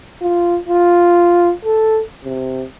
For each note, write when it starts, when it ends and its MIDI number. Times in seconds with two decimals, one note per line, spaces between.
0.22 0.59 65
0.68 1.52 65
1.65 2.01 69
2.24 2.65 48